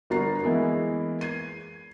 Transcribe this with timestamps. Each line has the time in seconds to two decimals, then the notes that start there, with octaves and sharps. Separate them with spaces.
0.10 G1 A#3 F#4 A#5 A6 C7
0.44 E3 G#3 A#3 B3 E4
1.21 G#6 C7 D#7